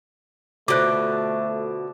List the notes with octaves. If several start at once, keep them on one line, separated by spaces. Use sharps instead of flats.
B2 D3 A3 F4 F#4 C5 D6 F#6